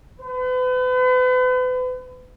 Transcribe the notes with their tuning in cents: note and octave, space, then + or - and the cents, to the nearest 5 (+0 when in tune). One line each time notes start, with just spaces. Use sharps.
B4 +40